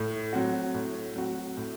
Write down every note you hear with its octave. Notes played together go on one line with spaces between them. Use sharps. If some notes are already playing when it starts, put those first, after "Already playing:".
Already playing: A2
F#3 C4 F#4
A2
F#3 C4 F#4
A2